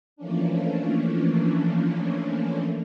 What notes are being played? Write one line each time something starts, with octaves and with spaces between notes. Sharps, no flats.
E3 F3 A3 A#3 C#4 D4